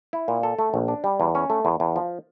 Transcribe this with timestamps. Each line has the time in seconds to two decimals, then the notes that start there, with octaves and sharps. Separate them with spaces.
0.13 E4
0.28 A#2
0.43 A4
0.59 A3
0.74 A#1
0.88 D4
1.04 G3
1.20 E2
1.35 C#4
1.50 A3
1.65 E2
1.80 E2
1.96 F3